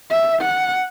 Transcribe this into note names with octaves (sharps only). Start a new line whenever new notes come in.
E5
F#5